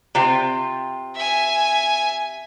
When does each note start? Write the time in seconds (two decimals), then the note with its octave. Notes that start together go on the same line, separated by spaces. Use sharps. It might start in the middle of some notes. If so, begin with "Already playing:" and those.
0.15 C3 C4 F4
1.16 E5 G#5